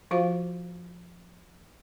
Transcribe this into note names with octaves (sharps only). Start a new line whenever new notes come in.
F3 F4 F#4 C5 F5